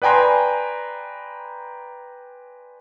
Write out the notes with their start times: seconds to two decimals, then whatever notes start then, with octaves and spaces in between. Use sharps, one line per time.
0.02 B4 D5 G5 G#5 A#5 C6